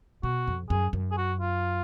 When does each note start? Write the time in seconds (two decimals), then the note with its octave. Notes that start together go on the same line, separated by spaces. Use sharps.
0.23 B2 F#4
0.47 F2
0.70 F#2 G#4
0.93 F#2
1.12 G#4
1.17 F#4
1.40 F4